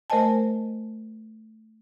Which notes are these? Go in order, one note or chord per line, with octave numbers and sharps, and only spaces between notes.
A3 A#4 C5 D#5 G#5 A5